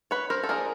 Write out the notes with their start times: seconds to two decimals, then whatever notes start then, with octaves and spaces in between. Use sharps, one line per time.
0.11 B4 C#5
0.30 A#4 C5
0.43 A4
0.49 F3 A#3 D4 G#4 A#4